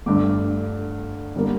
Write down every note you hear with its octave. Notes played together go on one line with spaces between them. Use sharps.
G1 G2 D3 A3 D6
D3 G3 A#3